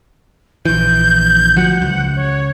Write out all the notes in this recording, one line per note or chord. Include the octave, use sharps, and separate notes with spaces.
A#1 E3 G6
D2 F3 F#3 F#5
C#2
C#5